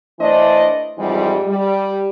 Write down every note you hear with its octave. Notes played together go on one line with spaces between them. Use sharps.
E3 A3 D4 C5 D5 D#5
F2 G#2 E3 G3
G3